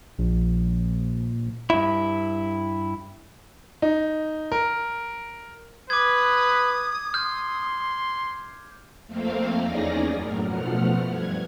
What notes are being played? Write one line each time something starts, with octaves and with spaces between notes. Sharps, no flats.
A#1
G2 E4
D#4
A#4
B4 D6 D#6 G#6
C6 F6 G6
F2 A3 A#3 C4 F5
E2 C#4 D#4 G#4 D5 A#6
F#2 A2 A#4
B2 F3 A3 F#5 F6
G2 G#6